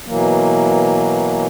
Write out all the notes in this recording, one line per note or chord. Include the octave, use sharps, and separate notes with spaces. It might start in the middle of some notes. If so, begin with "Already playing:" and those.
B2 E3 F#3 A#3